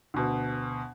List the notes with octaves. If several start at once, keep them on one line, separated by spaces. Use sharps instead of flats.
D2 B2